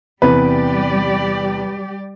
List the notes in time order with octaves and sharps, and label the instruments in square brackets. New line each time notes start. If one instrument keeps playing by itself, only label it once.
[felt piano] E2 C3 E3 [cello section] G3 G4 D5 [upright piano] B4